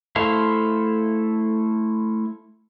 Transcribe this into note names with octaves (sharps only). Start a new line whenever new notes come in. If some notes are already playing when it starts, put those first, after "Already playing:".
A3 E4 A4 C5 F5